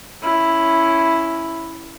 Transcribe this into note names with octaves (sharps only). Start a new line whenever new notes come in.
C#4 E4